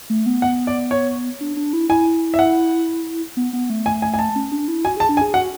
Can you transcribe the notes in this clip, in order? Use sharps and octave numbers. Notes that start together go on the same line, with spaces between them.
A3
B3
F#5
D5
C#5
D4
D4
E4
E4 G#5
E5
F#5
B3
B3
A3
G#5
G#5
G#5
A5
C#4
D4
E4
F#4 G#5
G#4 A5
D4
G#5
G#4
F#4 F#5